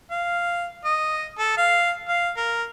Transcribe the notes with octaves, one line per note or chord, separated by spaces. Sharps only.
F5
D#5
A4
F5
F5
A#4